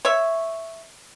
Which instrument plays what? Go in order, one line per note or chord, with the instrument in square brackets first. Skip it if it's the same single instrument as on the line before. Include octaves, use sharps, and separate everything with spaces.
[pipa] C#5 E5